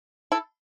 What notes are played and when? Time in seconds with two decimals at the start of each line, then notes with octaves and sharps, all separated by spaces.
0.32 E4 A4